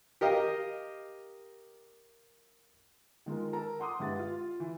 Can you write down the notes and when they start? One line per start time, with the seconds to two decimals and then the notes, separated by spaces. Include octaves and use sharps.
0.21 G4 A#4 D#5 F5
3.26 D#3 G#3 F4 A#4
3.53 A4 A#4 A5 A#5
3.80 F#5 C6 D6 D#6
4.00 G2 G#3 E4 B4 F#5 A6
4.19 F4
4.60 E3